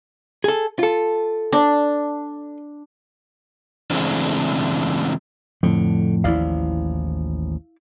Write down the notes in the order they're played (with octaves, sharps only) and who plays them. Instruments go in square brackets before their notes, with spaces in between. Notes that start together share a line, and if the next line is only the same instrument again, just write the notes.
[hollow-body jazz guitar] G#4 A4
F4 A4
[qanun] D4
[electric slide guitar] C#3 E3 G#3 A3 C4 D4
[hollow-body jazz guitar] F2 A2 [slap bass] D3
[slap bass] A1 D#2 F3 [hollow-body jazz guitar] E4 D5 F5